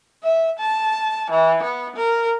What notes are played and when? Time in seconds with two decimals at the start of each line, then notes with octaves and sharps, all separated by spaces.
0.23 E5
0.59 A5
1.31 E3
1.62 B3
1.96 A#4